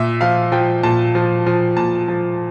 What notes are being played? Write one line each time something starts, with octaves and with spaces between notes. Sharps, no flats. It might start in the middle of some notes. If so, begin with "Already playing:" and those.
Already playing: A#2 E5
F3 F5
F3 G5
A#2 A5
F3
F3
A#2 A5
F3